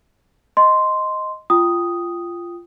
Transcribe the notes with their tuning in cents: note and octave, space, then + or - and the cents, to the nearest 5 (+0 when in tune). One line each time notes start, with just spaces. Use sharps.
D#5 +0 C6 -5
F4 -15 G5 +0 D#6 +0